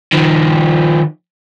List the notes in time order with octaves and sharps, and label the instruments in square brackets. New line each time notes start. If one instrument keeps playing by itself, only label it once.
[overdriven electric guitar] D#3 F3